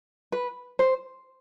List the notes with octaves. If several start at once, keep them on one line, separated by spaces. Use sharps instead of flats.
B4
C5